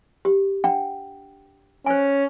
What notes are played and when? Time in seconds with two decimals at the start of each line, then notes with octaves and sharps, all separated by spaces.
0.25 G4
0.64 D4 F#5 G5
1.86 C#4 C5 G#5